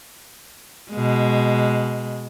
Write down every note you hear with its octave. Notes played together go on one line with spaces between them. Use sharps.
B2 G#3